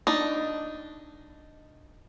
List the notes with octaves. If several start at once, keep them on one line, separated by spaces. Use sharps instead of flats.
D4 D#4